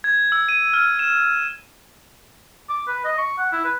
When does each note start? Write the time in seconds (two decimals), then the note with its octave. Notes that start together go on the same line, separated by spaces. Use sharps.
0.04 G#6
0.32 E6
0.49 D#7
0.74 F6
0.99 E7
2.69 D6
2.88 B4
3.05 D#5
3.18 C#6
3.38 F#5
3.52 E4
3.64 B4